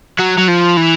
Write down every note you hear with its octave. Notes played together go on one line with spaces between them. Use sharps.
F#3
F#3
F3
E3